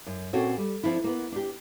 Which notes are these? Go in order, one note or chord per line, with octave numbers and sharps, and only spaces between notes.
F#2
A#2 C4 C#4 F#4 A4 C#5
G3
F3 C4 D4 E4
A#3 B3
D4 G4